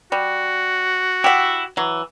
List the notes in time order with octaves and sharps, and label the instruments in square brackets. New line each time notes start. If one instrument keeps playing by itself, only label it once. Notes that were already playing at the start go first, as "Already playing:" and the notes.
[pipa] G3 [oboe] F#4
[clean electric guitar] E4 [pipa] G4 F#5
[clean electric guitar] E3 [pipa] F#3